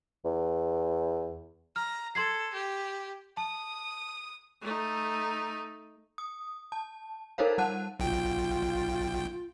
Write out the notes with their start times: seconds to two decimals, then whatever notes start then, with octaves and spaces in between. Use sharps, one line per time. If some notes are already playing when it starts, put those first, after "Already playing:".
0.25 E2
1.76 A#5 F6
2.15 A4 C6 G#6 C7
2.54 G4
3.37 A5 D#6
4.61 A3 D#4
6.18 D#6
6.72 A5
7.38 D#4 A4 A#4 C5 C#5 F5
7.58 G3 F#5 A5 F#6 D#7
8.00 B1 F4 G5